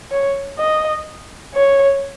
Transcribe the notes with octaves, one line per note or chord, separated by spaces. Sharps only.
C#5
D#5
C#5